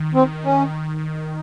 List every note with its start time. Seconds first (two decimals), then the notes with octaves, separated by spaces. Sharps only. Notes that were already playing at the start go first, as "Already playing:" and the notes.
Already playing: D#3
0.14 C4
0.44 C#4